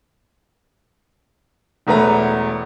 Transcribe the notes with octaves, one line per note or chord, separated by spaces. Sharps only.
E1 E2 A3 B4 A#5